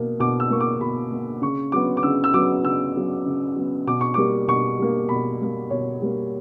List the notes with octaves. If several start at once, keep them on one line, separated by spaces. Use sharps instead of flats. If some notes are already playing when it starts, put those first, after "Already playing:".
Already playing: B2 A#3
B2 D6
E6
A#3 C#6
D6
B2 B5
A#3
C#3 C#6
F#3 B3 D6
D6
C#3 E6
E6
F#3 B3 D6
C#3 E6
F#3 B3
C#3
F#3 B3
B2 D6
C#6
G3 A#3 D6
B2 C#6
G3 A#3
B2 B5
G3 A#3
B2 C#5
G3 A#3